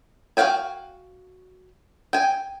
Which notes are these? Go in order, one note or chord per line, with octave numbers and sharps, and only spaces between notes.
F#4 B4 F5 G5 G#5
G5 G#5